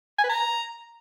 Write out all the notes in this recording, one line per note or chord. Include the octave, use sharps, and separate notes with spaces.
G#5
B4
A#5